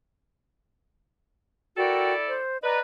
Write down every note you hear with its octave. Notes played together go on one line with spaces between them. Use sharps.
E4 F#4 A4 A#4 D5 G5
C5
B4 D5 D#5 A#5